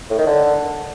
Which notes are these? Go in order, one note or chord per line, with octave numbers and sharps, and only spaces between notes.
A2
D#3
D3